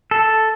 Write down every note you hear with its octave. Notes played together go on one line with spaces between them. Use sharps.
A4